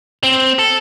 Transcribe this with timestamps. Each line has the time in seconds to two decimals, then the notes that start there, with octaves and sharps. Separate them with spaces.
0.23 C4
0.59 A4